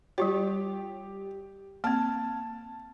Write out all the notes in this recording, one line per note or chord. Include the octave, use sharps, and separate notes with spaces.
G3 F4 G4 C#5
A#3 C4 A5